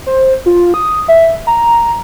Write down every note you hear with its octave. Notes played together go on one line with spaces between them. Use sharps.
C5
F4
D#6
E5
A#5